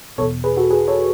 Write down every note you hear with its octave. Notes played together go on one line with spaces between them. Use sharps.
E2 B2 A4 C#5
G#4 B4
F#4 A4
G#4 B4
A4 C#5